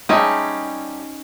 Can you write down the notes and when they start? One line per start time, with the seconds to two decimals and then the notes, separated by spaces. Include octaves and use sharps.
0.09 G3 A3 C#4 D#4 G#4